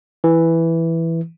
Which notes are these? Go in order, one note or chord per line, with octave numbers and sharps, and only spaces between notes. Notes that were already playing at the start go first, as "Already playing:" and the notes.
E3